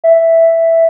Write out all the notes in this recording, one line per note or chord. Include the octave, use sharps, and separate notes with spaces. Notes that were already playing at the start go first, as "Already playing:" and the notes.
E5